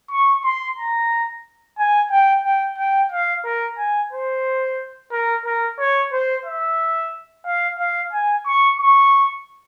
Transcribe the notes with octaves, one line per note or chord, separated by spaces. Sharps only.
C#6
C6
A#5
G#5
G5
G5
G5
F5
A#4
G#5
C5
A#4
A#4
C#5
C5
E5
F5
F5
G#5
C#6
C#6